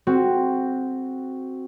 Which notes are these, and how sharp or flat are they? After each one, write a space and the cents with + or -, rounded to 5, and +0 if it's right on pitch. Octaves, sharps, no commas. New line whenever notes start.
C4 +0 F#4 +0 A4 -45